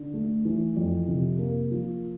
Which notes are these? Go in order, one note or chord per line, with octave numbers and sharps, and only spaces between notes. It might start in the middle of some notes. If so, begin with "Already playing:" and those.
Already playing: D3
A3
E3
F2
C3
A#3
F3